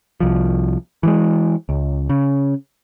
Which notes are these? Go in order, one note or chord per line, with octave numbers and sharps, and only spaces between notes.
C2 F3
E3 F3 G#3
C#2
C#3